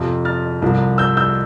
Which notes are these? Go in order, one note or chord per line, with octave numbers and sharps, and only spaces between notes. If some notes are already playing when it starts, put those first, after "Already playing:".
Already playing: F2 C3 F3
F6 A6
C2 C3 F3
E6 G6
E6 G6